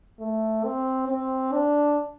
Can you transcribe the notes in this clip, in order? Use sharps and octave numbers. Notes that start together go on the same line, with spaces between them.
A3
C4
C4
D4